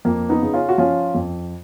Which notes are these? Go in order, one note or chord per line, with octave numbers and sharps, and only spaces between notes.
F2 A#3
B3 D#4
C#3
C#4 F4
F#4
F3 C#4 F4
F2